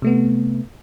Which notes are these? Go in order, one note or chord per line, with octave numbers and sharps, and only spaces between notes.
C3 A3 B3